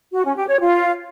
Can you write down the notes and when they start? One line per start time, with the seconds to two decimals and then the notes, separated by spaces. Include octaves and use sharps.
0.13 F#4
0.24 C#4
0.36 G4
0.48 C#5
0.60 F4